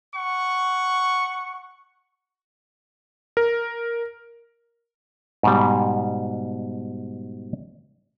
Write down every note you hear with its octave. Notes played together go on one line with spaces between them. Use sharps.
F#5 C#6
A#4
G#2 B2 G3